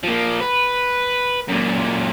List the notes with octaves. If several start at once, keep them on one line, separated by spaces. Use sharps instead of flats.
F3 A#3
B4
F#2 A#2